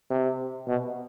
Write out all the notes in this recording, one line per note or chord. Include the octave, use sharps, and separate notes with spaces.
C3
B2